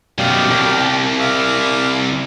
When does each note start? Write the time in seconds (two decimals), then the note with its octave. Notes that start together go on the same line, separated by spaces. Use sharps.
0.18 F#2 B2 G4 D5 F5
0.51 C2
1.19 E5 F5 D6